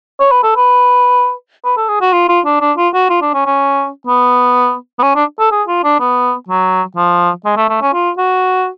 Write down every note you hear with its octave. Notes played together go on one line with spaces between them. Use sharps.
C#5
B4
A4
B4
B4
A4
G#4
F#4
F4
F4
D4
D4
F4
F#4
F4
D4
C#4
C#4
B3
B3
C#4
D4
A4
G#4
F4
D4
B3
F#3
F3
G#3
A3
A3
C#4
F4
F#4